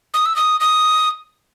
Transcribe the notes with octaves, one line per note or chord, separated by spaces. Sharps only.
D#6
E6
D#6
D#6